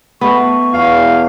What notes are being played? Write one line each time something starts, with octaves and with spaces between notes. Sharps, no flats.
A3 B3 C#6
E2 F5